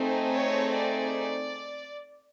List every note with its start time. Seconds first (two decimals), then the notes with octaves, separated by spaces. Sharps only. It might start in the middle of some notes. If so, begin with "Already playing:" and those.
Already playing: A3 C4 D#4 G#4
0.33 C#5
0.74 D5